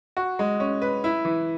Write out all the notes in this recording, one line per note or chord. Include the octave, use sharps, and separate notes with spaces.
F#4
G#3
C#4
B4
E4
E3